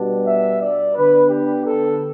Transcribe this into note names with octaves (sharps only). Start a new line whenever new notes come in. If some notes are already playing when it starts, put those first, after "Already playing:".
Already playing: B2 G3 B3 D4
E5
D5
D3 B3 D4 B4
G4
A4